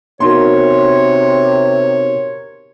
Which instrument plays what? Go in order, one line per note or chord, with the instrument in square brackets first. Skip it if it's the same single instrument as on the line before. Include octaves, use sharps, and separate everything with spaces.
[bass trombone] C3 [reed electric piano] B3 D#4 F#4 [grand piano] A#4 C6 [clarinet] C#5